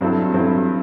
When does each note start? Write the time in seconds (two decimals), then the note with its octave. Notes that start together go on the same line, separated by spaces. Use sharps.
0.01 G2 F#3 C4 E4 A4
0.34 G2 F#3 C4 E4 A4